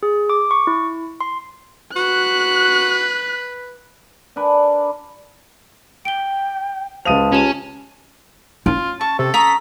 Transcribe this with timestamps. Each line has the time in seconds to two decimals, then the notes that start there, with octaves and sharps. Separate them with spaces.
0.03 G#4
0.30 D6
0.51 C#6
0.67 E4
1.21 C6
1.96 F#4 B4 F#6
4.36 D4 A#4 B4 G#5
6.05 G5 D7 G7
7.05 C#2 C5 F5 A5 D#6 D#7 F7
7.32 C#4 F4 G4 E7
8.66 C#4 F4
9.01 A5 C#6
9.19 C3 A4
9.34 A#5 C#6 D#6 B6